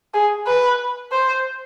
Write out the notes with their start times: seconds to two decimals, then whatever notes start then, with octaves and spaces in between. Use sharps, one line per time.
0.14 G#4
0.47 B4
1.12 C5